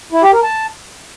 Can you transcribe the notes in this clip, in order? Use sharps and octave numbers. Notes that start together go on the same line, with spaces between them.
E4
G4
A#4
A5